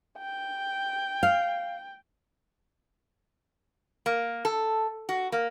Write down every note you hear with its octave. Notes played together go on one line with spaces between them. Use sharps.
G5
F5
A#3
A4
F#4
A#3